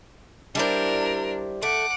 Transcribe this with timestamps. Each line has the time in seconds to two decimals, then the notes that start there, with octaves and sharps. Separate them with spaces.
0.55 G3 D4 E4 A#4 C5
1.63 A3 F#5 D6